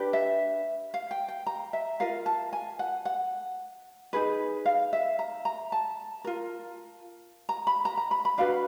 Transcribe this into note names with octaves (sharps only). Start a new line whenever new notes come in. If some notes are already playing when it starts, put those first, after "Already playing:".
Already playing: D4 G4 B4
E5
F5
G5
G5
A#5
E5
F4 A#4 F5
A5
G#5
F#5
F#5
D#4 G#4 B4
F5
E5
A#5
A#5
A5
F4 A#4
A#5
B5
A#5
A#5
B5
B5
D4 F#4 B4 F5